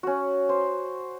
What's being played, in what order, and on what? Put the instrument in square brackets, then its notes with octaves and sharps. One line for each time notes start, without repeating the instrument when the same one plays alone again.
[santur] C#4 F#4
C5